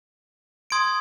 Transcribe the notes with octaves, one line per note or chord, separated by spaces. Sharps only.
C6 D#6 G#6 D7